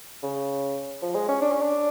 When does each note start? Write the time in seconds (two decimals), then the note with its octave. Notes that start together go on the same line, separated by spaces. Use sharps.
0.23 C#3
1.02 F3
1.15 G#3
1.28 C#4
1.41 D4
1.52 C#4
1.62 D4